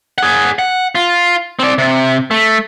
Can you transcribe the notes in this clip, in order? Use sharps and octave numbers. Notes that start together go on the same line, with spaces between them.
G#4 F#5
F#5
F4
C4 D5
C3
A3